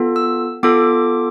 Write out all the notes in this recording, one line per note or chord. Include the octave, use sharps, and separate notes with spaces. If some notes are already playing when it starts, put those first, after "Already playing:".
Already playing: B3 F4 A4
E6
B3 F4 A4 D6